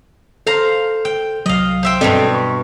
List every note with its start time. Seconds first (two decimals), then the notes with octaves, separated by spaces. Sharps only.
0.47 A4 C5 F5 A#5
1.05 G5
1.46 C2 F#3 D#5 F5
1.83 C5 E5 G5
2.01 G2 B2 G3 C4 A4 D#5
2.35 C#6